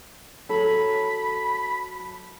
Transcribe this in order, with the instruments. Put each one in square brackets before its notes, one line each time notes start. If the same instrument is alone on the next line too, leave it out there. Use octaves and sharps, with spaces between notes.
[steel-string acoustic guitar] F#3 A4 [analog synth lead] B5